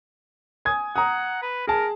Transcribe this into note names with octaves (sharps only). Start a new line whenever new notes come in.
G#5 D#6 G#6
F#5 A#5 D#6
B4
G#4 A#4 A5